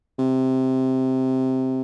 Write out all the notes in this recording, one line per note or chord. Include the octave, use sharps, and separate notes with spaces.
C3